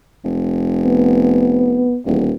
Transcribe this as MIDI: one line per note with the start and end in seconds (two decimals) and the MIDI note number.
0.24 1.91 29
0.85 1.98 59
2.06 2.32 27
2.06 2.25 40